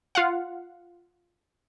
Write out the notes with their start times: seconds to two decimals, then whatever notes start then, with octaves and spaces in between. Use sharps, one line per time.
0.15 F4 F5 F#5